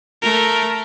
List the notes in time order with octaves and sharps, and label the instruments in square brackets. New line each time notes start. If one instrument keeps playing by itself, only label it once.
[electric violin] A3 A#4